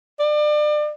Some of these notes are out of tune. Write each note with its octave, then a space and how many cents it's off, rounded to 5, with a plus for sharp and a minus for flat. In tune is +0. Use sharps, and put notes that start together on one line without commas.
D5 +35